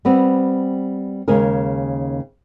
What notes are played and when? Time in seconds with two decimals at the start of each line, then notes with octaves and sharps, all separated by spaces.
0.05 G3 B3 C4
1.28 D#2 C#3 G#3 G#4 A#4